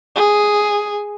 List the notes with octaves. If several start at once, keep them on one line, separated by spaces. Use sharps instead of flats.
G#4